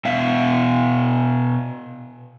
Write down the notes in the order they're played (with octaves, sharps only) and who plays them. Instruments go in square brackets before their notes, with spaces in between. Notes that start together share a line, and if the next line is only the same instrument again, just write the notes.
[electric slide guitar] B2 E5 F5